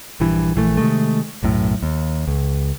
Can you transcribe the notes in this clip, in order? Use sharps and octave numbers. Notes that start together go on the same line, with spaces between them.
A#1 G2 E3
A#1 E3 A3
C3 D#3 G#3 A3
B1 F#2 A2
D#2
C#2